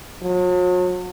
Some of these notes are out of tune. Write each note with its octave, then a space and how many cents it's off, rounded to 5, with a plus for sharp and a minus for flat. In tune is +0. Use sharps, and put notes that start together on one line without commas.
F#3 -40